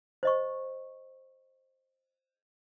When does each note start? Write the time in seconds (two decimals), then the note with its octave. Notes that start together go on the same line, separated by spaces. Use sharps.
0.23 C5 D#5 C#6